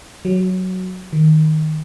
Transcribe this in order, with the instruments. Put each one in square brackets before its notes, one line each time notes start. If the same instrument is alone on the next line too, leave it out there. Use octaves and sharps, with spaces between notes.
[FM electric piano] F#3
D#3